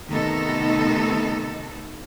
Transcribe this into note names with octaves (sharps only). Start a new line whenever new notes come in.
C3 D#3 A3 B3 D#4 A4